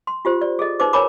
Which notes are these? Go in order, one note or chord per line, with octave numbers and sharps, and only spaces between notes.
C6
F4 G4 C5
D5
G#4 A4 D#5
D#4 B4 C5 D6
A#4 C#5 G#5 A#5 B5 D6